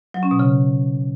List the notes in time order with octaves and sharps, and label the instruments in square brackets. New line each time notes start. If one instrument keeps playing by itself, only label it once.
[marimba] F#3
C#4
B2
C#3